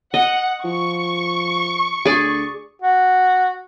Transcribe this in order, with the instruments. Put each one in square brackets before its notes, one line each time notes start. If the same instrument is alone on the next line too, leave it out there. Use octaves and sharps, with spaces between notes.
[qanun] D#5 [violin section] F#5
[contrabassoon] F3 [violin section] C#6
[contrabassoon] D2 [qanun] G#4 D5
[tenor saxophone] F#4